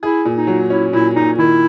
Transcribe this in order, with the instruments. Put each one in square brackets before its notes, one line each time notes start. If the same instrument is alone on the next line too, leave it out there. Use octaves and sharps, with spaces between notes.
[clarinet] E4 [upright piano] G#4
[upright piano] A#2
[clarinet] D#4
[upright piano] F#3
[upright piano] C#4 [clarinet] E4
[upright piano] A#2 [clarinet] E4
[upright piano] A#2 [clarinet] D#4
[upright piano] D#3 [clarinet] E4